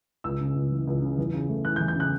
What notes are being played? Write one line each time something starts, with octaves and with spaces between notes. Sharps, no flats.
C#2 E6
C#3
C#2
E3
C#2
C#3
E2
C#3
A3
E3 F#6
G6
E2
G6
C#3 F#6